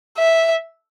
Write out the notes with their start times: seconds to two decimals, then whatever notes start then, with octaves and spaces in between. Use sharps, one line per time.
0.18 E5